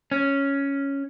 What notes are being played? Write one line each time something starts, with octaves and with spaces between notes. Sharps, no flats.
C#4